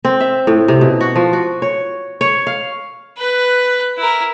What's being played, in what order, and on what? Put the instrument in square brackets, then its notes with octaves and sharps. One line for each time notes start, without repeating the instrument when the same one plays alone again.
[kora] C4
E5
A2
C3
B2
F#4
F3
F#4
C#5
C#5
F5
[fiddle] B4 F#6
E4 A#4